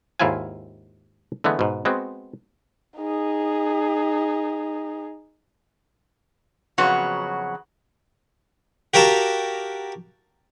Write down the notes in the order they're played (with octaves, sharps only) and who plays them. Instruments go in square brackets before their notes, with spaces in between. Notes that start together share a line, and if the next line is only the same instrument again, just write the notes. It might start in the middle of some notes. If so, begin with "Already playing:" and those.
[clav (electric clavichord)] D#2 G#2 E4 F4 F5 G#5
D3 E3 G#3 A3 B3
G#2 B2
G#3 B3 C4 F#4
[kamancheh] D#4 G#4
[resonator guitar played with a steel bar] F2 C#3 F#3 B3 F#4
[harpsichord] F#4 G4 A#4 F5 A5 A#5